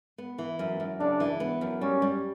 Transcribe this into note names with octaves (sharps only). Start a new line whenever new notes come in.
B3
E3
F#2
F#2
C#3 D4
E3
B3
F#2
G3 C#4
G3